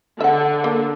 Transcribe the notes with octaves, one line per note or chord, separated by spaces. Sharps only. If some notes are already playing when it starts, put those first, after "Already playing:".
D3 E5 F#5
A#3